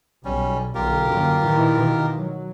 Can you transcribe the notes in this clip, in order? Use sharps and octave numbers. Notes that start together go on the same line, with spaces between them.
B1 G3 C#4
B1 D3 F4 G4 A#4
F#2 D3 A#3
A#2 D#3 E3
B2 D#3
F#3